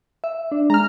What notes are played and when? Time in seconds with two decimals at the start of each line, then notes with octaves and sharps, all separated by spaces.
0.24 E5
0.52 D4
0.70 G#3 A#5 F6